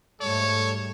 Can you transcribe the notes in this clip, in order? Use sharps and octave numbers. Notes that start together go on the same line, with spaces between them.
G#2 G3 A3 A4 C#5